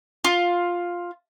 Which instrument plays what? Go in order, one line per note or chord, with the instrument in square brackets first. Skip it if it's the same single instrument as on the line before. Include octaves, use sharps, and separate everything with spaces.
[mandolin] F4